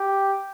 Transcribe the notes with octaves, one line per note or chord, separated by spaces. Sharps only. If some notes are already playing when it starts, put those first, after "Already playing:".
Already playing: G4